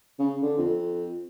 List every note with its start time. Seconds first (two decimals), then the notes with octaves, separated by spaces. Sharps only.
0.19 C#3
0.42 D3
0.58 F2